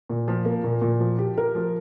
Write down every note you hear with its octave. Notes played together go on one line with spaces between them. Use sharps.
A#2
F3
A#3
A#2
A#2
F3
G4
A#4
F3